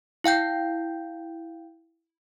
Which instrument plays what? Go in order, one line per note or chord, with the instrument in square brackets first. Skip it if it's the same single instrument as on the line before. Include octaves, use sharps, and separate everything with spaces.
[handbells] E4 F5 G5 G6